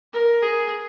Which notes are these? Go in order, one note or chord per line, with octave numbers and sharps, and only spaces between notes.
A#4
G#4